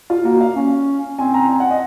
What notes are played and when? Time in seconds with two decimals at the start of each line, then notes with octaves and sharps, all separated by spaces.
0.10 F4
0.24 A#3 F#4
0.41 F5
0.56 C#4
1.18 C4 G#5
1.34 A#5
1.49 G#5
1.60 F#5
1.70 D#5